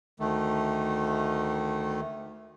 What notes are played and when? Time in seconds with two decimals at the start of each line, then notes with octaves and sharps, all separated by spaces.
0.20 D2 D#3 A3